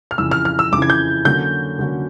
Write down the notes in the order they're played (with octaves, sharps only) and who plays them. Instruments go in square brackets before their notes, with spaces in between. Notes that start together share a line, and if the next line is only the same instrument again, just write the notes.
[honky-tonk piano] F6
[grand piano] F2 C#3 E3 [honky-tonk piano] E6
[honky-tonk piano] F6
F6
E6
[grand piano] F2 C#3 E3 [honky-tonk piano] D6
[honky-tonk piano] G#6
G6
[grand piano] D3 F#3 A#3 C#4 F#4 [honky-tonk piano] G6
[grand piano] D3 F#3 A#3 C#4 F#4